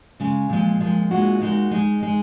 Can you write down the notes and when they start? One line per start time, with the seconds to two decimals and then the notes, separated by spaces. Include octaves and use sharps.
0.20 C#3 G#3 C#4
0.49 A#2 F3 G#3
0.80 A#2 F3 G#3
1.11 A#2 G#3 D#4 F#4
1.41 A#2 G#3 D#4 F#4
1.71 G#3 D#4 G#4
2.02 G#3 D#4 G#4